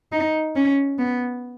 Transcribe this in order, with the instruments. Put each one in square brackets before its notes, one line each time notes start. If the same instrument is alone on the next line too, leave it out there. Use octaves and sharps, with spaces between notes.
[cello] D#4
C#4
B3